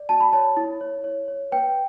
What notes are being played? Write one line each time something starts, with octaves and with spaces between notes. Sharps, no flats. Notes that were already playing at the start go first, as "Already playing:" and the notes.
Already playing: D5
F#4 A5
B5
C#5 A5
E4
C#5
C#5
C#5
B4 G5